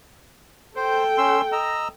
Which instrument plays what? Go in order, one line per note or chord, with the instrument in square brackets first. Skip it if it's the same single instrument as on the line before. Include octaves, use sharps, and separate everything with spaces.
[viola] A4 G5 [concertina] C5
[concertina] C#4 C6 E6
D#5 A#5 E6